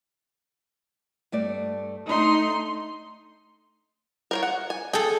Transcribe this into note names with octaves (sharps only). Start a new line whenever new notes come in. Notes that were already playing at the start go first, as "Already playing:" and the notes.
G2 A3 D5
A3 D4 D#4 C6
A#4 C5 C#5
F#5
G#5
G#4 A4 G5